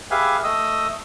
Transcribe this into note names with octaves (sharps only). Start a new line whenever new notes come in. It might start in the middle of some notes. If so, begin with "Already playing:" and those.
G4 G#4 B4 E5 F5 G#5
A3 D#5 D#6 E6